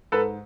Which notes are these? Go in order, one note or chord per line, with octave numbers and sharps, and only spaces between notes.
G#2 A4 B4